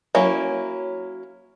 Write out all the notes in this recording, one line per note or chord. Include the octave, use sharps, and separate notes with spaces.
F#3 A#3 C#4 E4